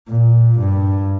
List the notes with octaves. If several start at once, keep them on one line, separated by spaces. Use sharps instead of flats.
A#2
G2